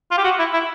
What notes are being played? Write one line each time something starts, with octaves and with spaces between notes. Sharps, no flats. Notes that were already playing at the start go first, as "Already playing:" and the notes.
F4
G4
F#4
E4
E4